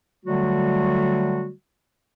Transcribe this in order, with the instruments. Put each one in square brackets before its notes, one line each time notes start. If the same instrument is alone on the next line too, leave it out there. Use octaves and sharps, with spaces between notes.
[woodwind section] D3 F#3 G3 A3 F#4